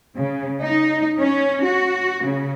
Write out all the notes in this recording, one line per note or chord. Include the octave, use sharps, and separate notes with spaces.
C#3
D#4
C#4
F#4
C#3